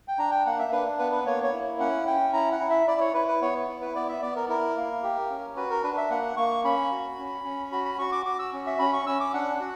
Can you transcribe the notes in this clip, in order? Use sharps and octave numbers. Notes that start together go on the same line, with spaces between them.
G5
D4 A#5
G5
A#3 F#5
E5
D4 B4
B3 B4
B4
A#3 C#5
C#5
E4
C#4 F#5
C#4 G5
E4 A#5
F#5
E4
E5
E4 D5
C#5
E4 B4
B4
B3 C#5
E4
B4
B3 D5
E5
B3 D5
A#4
E4 A#4
A#3
G4
C#4
F#4 B4
A#4
D4 B4
E5
A#3 F#5
A#3 C#6
C#4 B5
F#4
C#4
C#4
F#4 B5
B5
F#4 C#6
D6
F#4 D6
E6
C#4
E5
C#4 B5
C#6
C#4 E6
D6
D4 F#5
F#4